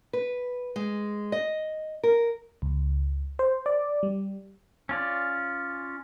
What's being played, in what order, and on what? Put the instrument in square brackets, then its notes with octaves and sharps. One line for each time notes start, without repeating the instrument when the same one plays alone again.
[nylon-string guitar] B4
G#3
D#5
A#4
[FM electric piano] C#2
C5
D5
G3
[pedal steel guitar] C#4 F4 D5